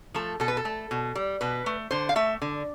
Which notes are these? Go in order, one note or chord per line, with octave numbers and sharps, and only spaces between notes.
F3 A3 A4
B2 A4
B4
A4
A3
B2
G3
B2 B4
A3
D3 C5
F5
A3 E5
D3